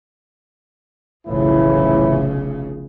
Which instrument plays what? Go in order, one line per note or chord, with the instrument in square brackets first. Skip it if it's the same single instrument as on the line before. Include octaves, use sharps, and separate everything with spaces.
[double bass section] F1 B1 C#3 [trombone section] A2 E3 E4